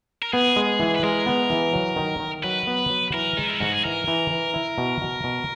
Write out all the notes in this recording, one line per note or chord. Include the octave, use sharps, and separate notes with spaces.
A#4
B3 G#4
G#3
E3
B4
G#3 A#4
B3
E3
F#3
D#3
D#3
F#3 B4
B3
F#3
E3 A#4
G#3 D#4
E4
G#2 F#4
G#4
E3 A#4
E3
E3
E4
B2
B2
B2